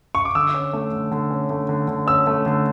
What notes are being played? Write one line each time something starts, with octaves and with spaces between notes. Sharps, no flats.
C#6
D6
D3 E6
C#4
A3
D3
D3
C#4
A3
D3
D3
C#4 E6
A3
D3